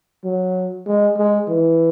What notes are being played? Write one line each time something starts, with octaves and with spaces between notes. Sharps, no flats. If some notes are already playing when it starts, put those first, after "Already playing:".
F#3
G#3
G#3
E3